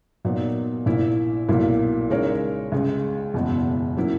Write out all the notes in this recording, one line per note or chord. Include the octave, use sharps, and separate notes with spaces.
A#2 F#3 B3 D#4
A#1 A#2 A#3 E4
B1 A#2 F#3 A#3 E4
C#3 G#3 D#4 A#4 C#5
C#2 C#3 G#3
F#1 E2 B2 G#3
C#3 F#3 A#3 E4